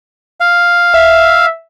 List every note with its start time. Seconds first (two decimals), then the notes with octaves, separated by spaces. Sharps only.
0.40 F5
0.94 E5